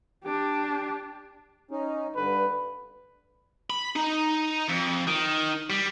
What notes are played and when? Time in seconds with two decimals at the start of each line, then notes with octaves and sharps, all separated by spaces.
0.24 D4 G4
1.71 C#4 D#4
2.16 G2 D3 B4
3.70 B5
3.96 D#4
4.69 F2
5.07 D#3
5.70 G3